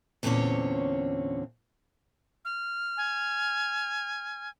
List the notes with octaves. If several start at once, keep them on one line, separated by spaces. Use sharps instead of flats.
E2 A#2 D3 C4 C#4 C#5
F6
G#5